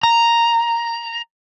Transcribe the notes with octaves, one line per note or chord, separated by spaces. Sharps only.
A#5